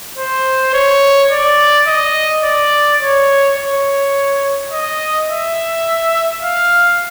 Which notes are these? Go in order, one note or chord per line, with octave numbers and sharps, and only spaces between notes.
C5
C#5
D5
D#5
D5
C#5
C#5
D#5
E5
F5